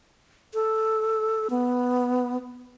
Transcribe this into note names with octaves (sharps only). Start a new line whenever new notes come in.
A4
B3